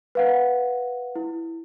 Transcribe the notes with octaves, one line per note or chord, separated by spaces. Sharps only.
B4 F5 F#5
E4